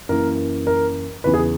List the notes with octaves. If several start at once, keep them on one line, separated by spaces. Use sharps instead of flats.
F#2 E3 A#3 A#4
A#4
E2 C#3 E3 B4
G#4